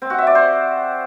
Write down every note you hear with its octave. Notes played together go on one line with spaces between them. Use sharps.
C4
F#4
E5
D5
C5